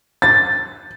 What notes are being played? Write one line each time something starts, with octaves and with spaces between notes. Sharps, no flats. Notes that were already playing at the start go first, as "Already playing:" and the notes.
A6